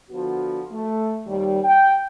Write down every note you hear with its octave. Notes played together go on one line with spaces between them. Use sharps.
D3 F3 B3 F#4
A3
D#2 G3
G5